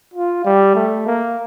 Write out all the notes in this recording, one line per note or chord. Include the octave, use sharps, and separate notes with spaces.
F4
G3
A3
A#3